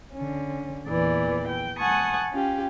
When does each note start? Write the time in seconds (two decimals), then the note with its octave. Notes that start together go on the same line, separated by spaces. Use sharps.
0.14 D3 C#4
0.86 E2 A#2 E3 D5
1.48 G5
1.78 F#5 G#5 A5 C#6 D#6
2.32 C#4 F4 G4